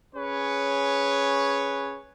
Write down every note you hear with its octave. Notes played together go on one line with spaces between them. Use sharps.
C#4 G#4 B4 C#5